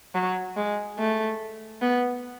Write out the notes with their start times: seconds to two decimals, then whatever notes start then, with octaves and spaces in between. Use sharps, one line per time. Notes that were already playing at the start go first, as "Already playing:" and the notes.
0.15 F#3
0.57 G#3
0.98 A3
1.82 B3